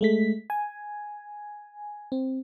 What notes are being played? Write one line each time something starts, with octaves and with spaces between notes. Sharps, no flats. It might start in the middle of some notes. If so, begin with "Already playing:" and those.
G#3 A3 B6
G#5
C4